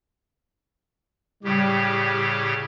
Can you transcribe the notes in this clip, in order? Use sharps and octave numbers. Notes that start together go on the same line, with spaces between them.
A2 C#3 G3 G4